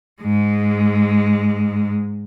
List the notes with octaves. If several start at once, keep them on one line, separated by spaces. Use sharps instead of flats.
G#2 G#3